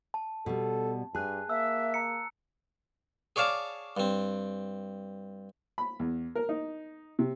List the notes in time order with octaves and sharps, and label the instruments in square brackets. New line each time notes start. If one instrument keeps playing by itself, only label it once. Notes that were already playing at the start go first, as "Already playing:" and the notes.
[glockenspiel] A5
[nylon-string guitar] B2 G3 [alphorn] A4
[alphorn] G2 [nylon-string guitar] G#4 [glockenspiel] A5 F#6
[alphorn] A#3 [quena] E5 [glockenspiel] E6
[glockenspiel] A#5 C#7
[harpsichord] G#4 C#5 D5 F5 A5 D6
G2 C4
[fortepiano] B5
E2
A#4
D#4
C3